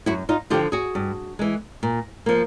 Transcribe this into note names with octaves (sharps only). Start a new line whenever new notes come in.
F#2 E4 F#4
D#4 F4
D3 F3 F4 G4
F#4 G#4
G2
E3 G#3
A#2
F3 A#3